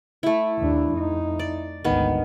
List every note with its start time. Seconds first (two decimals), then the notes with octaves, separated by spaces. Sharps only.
0.23 A3 E4
0.58 D#2 D4
0.93 F2 D#4
1.39 D5
1.84 G#1 D2 D#3 B3